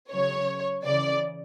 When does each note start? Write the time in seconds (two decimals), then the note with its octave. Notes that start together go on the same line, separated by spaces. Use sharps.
0.11 C#3 F#3 C#5
0.85 C#3 E3 D5